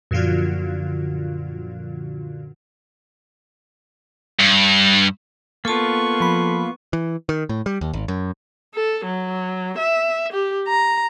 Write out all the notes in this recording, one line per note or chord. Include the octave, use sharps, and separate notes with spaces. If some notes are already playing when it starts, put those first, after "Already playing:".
F#2 A#2 D3 F3 F4 F#4
G2
A#3 B3 F4 A4 A5 C#6
F3 B5
E3
D#3
A2
G3
D#2
G#1
F#2
A4
F#3
E5
G4
A#5